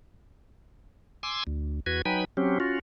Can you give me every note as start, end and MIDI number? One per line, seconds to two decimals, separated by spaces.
1.23 1.44 80
1.23 1.44 84
1.23 1.44 86
1.23 1.44 88
1.47 1.80 38
1.86 2.02 40
1.86 2.02 66
1.86 2.02 71
1.86 2.02 92
2.05 2.25 54
2.05 2.25 63
2.05 2.25 71
2.05 2.25 79
2.05 2.25 80
2.05 2.25 83
2.37 2.58 54
2.37 2.58 60
2.37 2.58 61
2.37 2.58 67
2.60 2.79 61
2.60 2.79 65
2.60 2.79 66